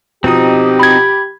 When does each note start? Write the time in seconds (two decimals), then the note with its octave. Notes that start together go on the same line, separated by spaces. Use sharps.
0.24 B2 F3 C4 D#4 G4 D#6
0.79 B5 G#6